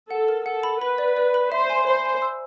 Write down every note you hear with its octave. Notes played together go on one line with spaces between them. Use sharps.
A4 F#5
A#4
A4 F#5
B5
B4 B5
D5
D5
B5
C5 E5
G#5
C5 B5
G#5
E6